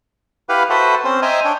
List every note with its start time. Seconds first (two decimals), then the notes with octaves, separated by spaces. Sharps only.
0.49 E4 G4 B4 F5 F#5
0.70 F#4 A4 B4 C5 E5
1.05 C4 C#4 C5
1.22 C5 D#5 E5 G5 G#5 A#5
1.45 D4 C#5 G5